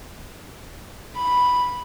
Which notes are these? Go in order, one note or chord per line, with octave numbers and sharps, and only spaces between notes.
B5